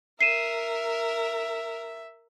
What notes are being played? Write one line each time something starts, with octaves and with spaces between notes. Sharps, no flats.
A#4 E5 C7 D#7 E7